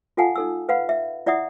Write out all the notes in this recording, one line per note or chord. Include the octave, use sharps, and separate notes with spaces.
F4 A4 F5 F#5 G#5 A5
D#4 A4 E6
B4 F5 F#5 B5
E5
E4 D5 E5 F#5 D#6